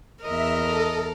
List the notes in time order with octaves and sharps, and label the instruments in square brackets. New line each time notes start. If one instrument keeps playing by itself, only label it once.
[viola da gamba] E2 A#4 [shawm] D#5 [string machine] E5
[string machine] A4